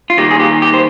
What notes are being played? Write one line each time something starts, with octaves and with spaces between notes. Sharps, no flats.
F4
D#3 G3 A#3 G4
G#4
G4
G4
C5